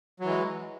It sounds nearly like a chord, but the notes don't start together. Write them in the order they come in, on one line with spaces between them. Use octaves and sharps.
F#3 E3 G#3